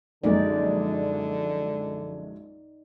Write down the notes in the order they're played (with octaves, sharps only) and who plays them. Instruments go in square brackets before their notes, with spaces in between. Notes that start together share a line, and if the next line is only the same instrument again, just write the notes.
[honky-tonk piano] A#1 F#2 G#3 [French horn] D3 [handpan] D#4 D5